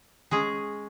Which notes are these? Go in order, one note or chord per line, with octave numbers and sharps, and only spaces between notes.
G#3 C#4 G#4